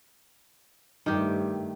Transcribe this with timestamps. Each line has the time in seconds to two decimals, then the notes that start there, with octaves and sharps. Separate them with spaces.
1.06 G2 D#3 A3 G4